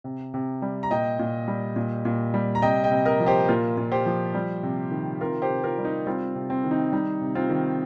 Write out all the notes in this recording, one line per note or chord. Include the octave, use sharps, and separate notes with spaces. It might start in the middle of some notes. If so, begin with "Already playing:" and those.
C3
C3
G3
A#5
A#2 D#5 G5
A#2
G3
A#2
A#2
G3
A#5
C3 D#5 G5
D#5 G5
C3
A#4 D#5
F3
G4 C5
A#2 F4 A#4
A#2
G4 C5
F3
G3
C3
D#3
C3 F4 A#4
G4 C5
C3
F4 A#4
G3
D#4
G3 C4 F4
C3
C4
D#3
D#4
G3 D#4
C3
C4 F4
D#3